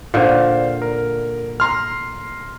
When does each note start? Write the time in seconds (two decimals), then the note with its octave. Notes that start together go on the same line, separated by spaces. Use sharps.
0.14 A#2 D3 C5 F5
0.82 A#4
1.60 A#5 C6 F6